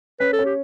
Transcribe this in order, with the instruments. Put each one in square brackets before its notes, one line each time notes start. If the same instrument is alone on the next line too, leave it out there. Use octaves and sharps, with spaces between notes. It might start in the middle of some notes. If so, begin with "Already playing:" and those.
[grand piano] C#4 [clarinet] B4
[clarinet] A4
[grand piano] C#4
[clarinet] G4